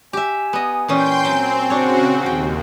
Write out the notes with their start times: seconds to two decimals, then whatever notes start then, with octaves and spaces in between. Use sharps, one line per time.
0.13 G4 E5 G#5
0.53 B3 D#5
0.88 A#2 E3 C#4 G5 C6 G6
1.25 F#3 C4
1.70 C#3 C4 D4 F#4 C#5
2.22 D#2 F3 G5